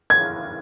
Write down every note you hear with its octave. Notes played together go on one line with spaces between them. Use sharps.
G#6